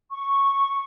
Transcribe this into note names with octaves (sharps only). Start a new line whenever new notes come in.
C#6